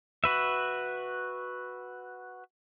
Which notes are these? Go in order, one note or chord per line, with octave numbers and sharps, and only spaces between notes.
F#4 B4 E5